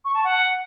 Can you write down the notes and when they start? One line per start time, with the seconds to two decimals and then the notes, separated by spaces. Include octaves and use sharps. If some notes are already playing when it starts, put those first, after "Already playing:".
0.05 C#6
0.14 A5
0.24 F#5